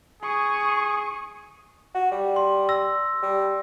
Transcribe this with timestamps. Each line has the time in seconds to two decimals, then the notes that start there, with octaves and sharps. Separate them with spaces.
0.23 G#4 C#6 D#6
1.95 F#4
2.12 G3
2.36 C6
2.69 E6 A#6
3.23 G3